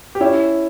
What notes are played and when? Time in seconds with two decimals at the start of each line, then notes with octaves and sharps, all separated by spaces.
0.15 G4
0.21 C#4 E4